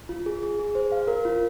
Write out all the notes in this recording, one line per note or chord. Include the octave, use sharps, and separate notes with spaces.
F4
G#4
G#4
G#4
C5
F5
A#4
F4